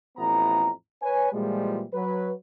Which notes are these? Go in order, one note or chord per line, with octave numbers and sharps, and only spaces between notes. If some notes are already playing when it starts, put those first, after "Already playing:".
A1 F2 B3 E4 A#5
B4 C#5 G#5
A#2 E3 F3 G3 G#3
F#3 B4